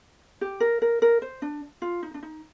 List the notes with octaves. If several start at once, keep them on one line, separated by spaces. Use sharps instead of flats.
G4
A#4
A#4
A#4
C5
D4
F4
D#4
D4
D#4